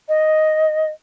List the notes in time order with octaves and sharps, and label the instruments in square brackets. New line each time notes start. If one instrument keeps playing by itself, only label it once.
[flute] D#5